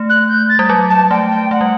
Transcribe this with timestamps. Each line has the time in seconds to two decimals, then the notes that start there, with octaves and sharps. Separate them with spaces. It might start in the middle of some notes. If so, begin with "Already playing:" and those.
Already playing: A3
0.09 F#6
0.28 G6
0.49 A6
0.59 G3
0.69 F#3
0.90 A5
1.11 A3 G5
1.31 G5
1.51 A3 F#5
1.61 G3